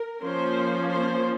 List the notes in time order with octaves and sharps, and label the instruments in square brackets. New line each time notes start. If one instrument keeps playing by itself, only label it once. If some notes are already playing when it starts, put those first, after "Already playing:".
Already playing: [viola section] A#4
F3 A#3 C#4 C5
C5